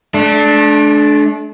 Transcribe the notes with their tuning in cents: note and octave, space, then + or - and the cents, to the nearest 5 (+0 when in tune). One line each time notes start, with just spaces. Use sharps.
A3 -40 D4 +0